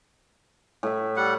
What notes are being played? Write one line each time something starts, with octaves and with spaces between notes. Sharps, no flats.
A2 E5
G3 F#5